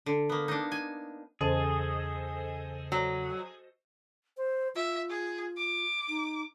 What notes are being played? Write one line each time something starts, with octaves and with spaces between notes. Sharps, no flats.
D3
A#3 B3
D4 D#4
G#5
E2 C#3 G#4 A4 C5 D#5
F#3
C5
F4 E5
G#4
D6
D#4